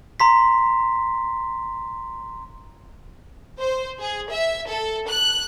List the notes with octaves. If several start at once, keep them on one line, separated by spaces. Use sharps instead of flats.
A#5 C6 B6
C5
G#4
E5
A4
F#6